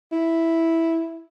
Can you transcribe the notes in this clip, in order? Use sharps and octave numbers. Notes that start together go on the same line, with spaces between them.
E4